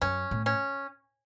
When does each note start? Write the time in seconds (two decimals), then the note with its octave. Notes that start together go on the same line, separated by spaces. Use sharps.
0.02 F#2 C#4
0.31 A2
0.46 C#4